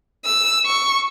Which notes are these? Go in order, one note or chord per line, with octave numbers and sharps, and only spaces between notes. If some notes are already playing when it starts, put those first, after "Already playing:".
E6
C#6